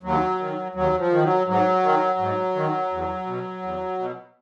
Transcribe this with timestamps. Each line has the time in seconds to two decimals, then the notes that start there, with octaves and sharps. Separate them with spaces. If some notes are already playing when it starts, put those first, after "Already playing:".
0.03 D#2 F#3
0.40 D#3
0.75 D#2 F#3
0.99 F3
1.11 D#3
1.23 F#3
1.47 G#2 F#3
1.83 D#3
2.19 G#2
2.55 D#3
2.92 E2
3.27 B2
3.63 E2
3.99 B2